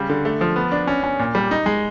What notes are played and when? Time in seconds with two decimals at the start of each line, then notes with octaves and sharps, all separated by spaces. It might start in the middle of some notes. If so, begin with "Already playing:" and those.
Already playing: C#3 G3
0.09 D3
0.25 A3
0.41 F3
0.56 B3
0.72 D4
0.87 C#4
1.04 C#4
1.19 A#2
1.35 G3
1.51 D#4
1.66 G#3